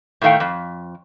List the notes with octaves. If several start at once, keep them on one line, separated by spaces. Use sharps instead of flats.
A2 D#3 A3 F5 G5
F2